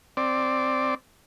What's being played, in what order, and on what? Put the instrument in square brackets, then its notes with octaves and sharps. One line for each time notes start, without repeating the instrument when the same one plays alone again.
[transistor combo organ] C4 D5